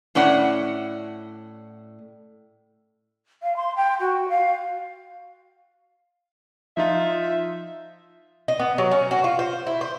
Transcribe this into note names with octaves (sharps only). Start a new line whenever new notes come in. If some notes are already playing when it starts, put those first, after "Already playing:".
A2 C#4 D5 F#5
F5
C6
G5
F#4
F5
F3 D#4 F4 E5
D#5
B3
F#3
C#4
F#4
F4
C5
E4
C5